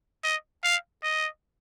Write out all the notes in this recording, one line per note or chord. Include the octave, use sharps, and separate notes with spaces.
D#5
F5
D#5